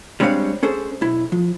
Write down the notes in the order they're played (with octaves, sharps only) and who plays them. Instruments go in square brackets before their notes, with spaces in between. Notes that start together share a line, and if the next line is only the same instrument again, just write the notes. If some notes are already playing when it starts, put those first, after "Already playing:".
[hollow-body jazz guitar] G3 G#3 C4 D4 C#5 F5
C#4 G#4 A4 C5
B1 E4
F3